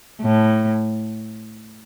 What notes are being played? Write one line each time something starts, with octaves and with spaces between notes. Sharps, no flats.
A2